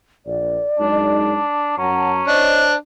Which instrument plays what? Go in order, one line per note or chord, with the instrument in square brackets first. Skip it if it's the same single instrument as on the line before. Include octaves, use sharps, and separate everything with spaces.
[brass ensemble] A#1 [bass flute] D5
[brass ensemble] F#2 G#3 D#4 [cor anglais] D4
[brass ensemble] F#2 A5 A#5 [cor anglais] C#4 [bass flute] F#5
[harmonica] D4 [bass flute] C5 [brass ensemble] C#5 D#5